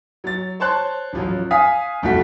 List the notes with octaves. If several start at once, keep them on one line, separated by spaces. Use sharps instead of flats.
F#3 A6
C5 C#5 A5 C6 F#6
A1 F3 F#3
F5 G#5 D#6 B6
B1 F2 A3 F4 F#4 B6